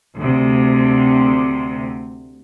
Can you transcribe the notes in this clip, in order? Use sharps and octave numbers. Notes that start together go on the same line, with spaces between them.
D2 C3